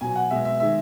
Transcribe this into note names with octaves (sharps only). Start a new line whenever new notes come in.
B2 F#3 G#5
F#5
B2 G#3 E5
E5
D#3 G#3 E5